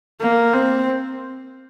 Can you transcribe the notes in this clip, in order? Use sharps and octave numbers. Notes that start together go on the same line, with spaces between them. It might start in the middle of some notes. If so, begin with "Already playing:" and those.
A#3
C4